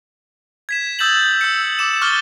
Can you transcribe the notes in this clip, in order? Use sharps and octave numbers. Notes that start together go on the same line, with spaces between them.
G#6 B6 E7
D#6 E6 G6 A6 E7 F#7
E6 C#7
D6 E7
C#6 D6 F6 F#6 A6 G7